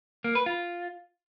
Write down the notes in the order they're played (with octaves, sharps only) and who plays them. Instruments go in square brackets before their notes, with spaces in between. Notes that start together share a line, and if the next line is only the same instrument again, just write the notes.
[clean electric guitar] A#3
B4
F4